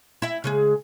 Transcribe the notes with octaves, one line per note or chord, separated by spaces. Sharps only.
E4 E5
C#3 G#3 G#4